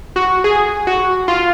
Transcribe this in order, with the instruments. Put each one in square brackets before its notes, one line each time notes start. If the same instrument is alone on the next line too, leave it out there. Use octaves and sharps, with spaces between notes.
[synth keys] F#4
G#4
F#4
F4